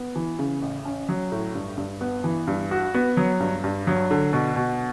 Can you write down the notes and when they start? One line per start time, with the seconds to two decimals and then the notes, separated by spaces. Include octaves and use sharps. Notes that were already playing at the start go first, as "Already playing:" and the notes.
Already playing: B3
0.16 E3
0.39 C#3
0.62 A1
0.85 C#4
1.09 F#3
1.32 A2
1.55 G2
1.78 G2
2.01 B3
2.24 E3
2.47 G2
2.71 F#4
2.94 B3
3.17 F#3
3.40 G2
3.64 G2
3.87 F#3
4.11 D3
4.33 B2
4.56 B2